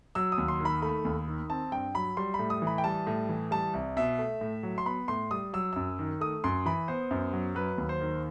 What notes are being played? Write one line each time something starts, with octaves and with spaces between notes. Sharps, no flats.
F#3 E6
D#6
D#2
C6
D#3 B5
A3 B5
D#2
D#3
C4 A5
G2 G5
F#3 B5
G3 C6
B5
A2
D#6
E3
B5
G5
G3 A5
A2
E3
G3 A5
C2
B2 E5
A3
A2
F#3
C6
B3 B5
A2 C6
G3 D#6
F#3 E6
F#2 E6
D#3
A3 D#6
F#2 C6
E3 B5
B3 C5
F#2
F#3
F#3 B4
D#2
C5
D#3